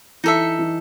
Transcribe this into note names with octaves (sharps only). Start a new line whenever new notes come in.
E3 D#4 A4 E5
E3